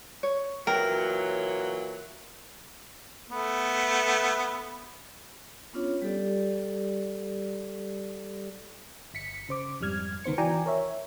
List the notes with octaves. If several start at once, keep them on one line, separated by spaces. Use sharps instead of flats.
C#5
A#2 E3 F#3 A#4 G5
A3 B3
B3 C#4 D4 F4 C#5
G3 G4 A4 D5
G1 B6 C#7
C#3 C5 D6
F2 G#2 G3 F6 G#6
C#2 D#3 B3 C5 C#7
E3 F#4 D5 G5 G#5 A#5
A#4 C#5 E5